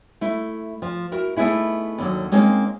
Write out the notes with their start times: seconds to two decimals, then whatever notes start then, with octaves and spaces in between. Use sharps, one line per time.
0.21 A3 E4
0.82 F3
1.12 E4 F#4 A#4
1.36 A3 B3 D#4 E4 G#4
1.98 D#2 D3 F#3
2.32 G#3 A#3 C4 C#4 D#4